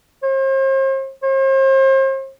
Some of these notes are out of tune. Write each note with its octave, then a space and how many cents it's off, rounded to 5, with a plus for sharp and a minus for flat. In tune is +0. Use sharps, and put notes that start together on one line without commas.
C5 +40
C5 +40